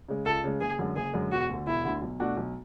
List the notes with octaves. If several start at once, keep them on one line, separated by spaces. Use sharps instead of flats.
C#3 G#3
C#2 A4
C#3 G#3
F#1 G#4
F#2 D3 G#3
F#1 G#4
F#2 D3 G#3
E1 F#4
D2 D3
E1 E4
D2 D3
B1
B2 A3 D4 F#4
B1